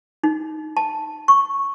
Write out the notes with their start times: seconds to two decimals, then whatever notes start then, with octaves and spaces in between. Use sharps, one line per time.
0.23 D#4
0.77 A5
1.28 C#6